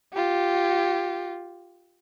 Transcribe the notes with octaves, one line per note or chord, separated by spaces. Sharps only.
F4 G4